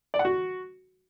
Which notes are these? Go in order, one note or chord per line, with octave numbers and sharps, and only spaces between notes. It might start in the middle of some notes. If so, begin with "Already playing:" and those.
D5
F#5
F#4